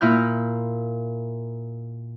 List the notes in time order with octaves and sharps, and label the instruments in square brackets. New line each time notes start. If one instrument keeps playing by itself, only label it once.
[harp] A#2 E4 F6 G6